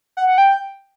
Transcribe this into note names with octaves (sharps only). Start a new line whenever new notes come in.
F#5
F#5
G5